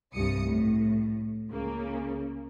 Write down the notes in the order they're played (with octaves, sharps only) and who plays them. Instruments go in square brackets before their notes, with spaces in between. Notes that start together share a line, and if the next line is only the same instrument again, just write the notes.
[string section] C2 G2 D#6 C#7
A2
C#2 C#3 A#3